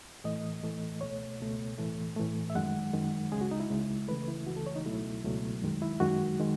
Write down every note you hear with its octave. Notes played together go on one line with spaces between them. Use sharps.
A2 E3 A3 D#5
A2 E3 A3
C#2 B2 A3 C#5
C#2 B2 A3
A2 E3 A3
A2 E3 A3
E5
F#2 D#3 G#3 F#5
F#2 D#3 G#3
C#2 C#3 G#3 G#4
F#4
D#4
E4
C#2 C#3 G#3
C#2 C#3 E3 A3 B4
E4
C#2 C#3 E3 A3 F#4
A4
C#5
D#4
C#2 B2 F#3 A3 E4
C#2 B2 F#3 A3
F#2 D#3 G#3
E4
F#2 D#3 G#3 F#4
D#3 G#3